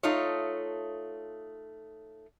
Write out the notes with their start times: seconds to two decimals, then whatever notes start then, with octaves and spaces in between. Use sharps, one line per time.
0.03 A3 D#4 F4 C#5